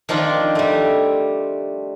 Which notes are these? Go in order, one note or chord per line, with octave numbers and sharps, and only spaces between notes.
D#3 F3 C4 D4 F4
G3 A3